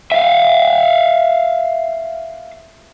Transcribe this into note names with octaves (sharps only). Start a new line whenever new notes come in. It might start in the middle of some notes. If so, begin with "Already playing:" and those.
E5 F5